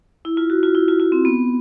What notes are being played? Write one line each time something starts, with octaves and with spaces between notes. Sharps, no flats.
E4
F4
F#4
F4
E4
F4
F4
C4
B3